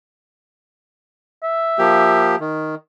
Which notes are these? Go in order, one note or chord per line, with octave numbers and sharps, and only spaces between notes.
E5
F3 A#3 G4
D#3